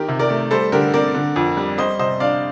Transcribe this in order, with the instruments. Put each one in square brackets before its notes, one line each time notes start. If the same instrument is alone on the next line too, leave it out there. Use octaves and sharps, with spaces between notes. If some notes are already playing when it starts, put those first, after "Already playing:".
Already playing: [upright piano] D#3 G4 A#4
C3
A#4 D5
A3
G3 A4 C5
D3 G4 A#4
C4 A#4 D5
D3
F2
G3
G3 C5 D#5
C3 C5 D#5
D4 D5 F5